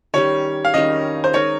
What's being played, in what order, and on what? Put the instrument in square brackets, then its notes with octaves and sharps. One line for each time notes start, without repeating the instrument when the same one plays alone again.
[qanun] D#3 G3 C#4 G4 [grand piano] C#5
[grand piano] F5
[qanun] D#3 G3 C#4 G4 [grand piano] D#5
[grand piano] C5
[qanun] G#3 D#4 A#4 [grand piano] C#5